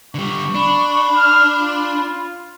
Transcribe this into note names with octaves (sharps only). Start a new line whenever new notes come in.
D3 G3 C#6
D4 B5
F6
F4